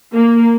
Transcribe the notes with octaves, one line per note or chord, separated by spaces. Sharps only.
A#3